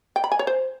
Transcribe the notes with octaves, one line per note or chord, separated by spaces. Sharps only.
G5
B5
G#5
C#5
C5